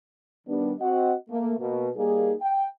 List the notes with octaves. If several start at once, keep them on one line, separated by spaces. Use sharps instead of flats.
D#3 G3 B3 D4
C4 F#4 D#5 F#5
A3 A#3
B2 A#3
G3 A#3 D#4 G#4
G5